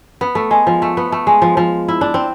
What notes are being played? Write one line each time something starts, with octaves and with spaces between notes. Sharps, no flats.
B3
A3
G#3
F3
A3
B3
A3
G#3
F3
F3
E4
D4
C4